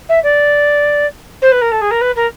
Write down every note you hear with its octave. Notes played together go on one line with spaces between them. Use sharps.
E5
D5
C5
B4
A#4
A4
G#4
A#4
B4
A#4